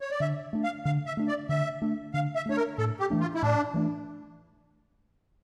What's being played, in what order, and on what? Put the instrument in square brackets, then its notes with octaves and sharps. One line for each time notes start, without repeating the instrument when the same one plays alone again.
[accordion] C#5
D5
[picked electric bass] D3 [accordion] E5
[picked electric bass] A3 D4
[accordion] F5
[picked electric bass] D3 [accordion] F5
[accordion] E5
[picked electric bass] A3 D4
[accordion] D5
[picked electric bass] D3 [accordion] E5
[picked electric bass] A3 D4
[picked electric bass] D3 [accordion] F5
[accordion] E5
[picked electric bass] A3 D4 [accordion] C#5
[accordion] A#4
[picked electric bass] A2 [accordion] A4
[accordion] G4
[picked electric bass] E3 A3 D4
[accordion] F4
E4
[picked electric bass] A2 [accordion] D4
[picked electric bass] E3 A3 D4